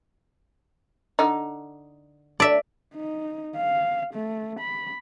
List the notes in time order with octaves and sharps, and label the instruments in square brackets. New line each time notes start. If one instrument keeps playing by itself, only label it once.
[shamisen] D3 D#4
[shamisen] D4 [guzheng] D5 E5
[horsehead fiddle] D#4
F5
A3
B5